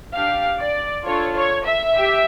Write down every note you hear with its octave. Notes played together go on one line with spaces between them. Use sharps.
D4 G4 F5
D5
D4 F4 A4 C#5
C#5
E5
G4